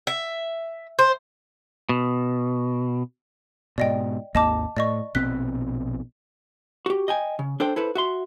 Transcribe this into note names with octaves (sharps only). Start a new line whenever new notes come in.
E5
C5
B2
G#2 B2 D5 D#5 G5
G#1 D#2 A#3 D#5 A5 D6
A2 D5 D#5 C#6
A#1 B2 C4 F#6 B6
F#4 G4
D#5 G5 G#5
C#3
D4 A4 C5 G5
E4 A4 B4 C5
F#4 E5 C6